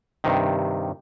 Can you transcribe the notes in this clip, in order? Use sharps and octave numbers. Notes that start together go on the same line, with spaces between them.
G2 C3 D#3